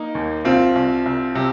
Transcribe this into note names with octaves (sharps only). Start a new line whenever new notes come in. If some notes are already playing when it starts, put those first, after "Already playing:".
Already playing: A#3 D#4
D#2
C2 C4 F4
C2
C2
C3